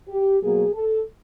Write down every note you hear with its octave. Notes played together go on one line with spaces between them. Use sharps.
G4
B2 F#3 A#3 G#4
A4